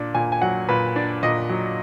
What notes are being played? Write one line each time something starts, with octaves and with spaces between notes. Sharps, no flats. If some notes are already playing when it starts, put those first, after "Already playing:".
Already playing: A#2 D4
A#2 G#5
G#5
F#3 F#5
A#2 B4
D4 D5
A#2 D#5
F#3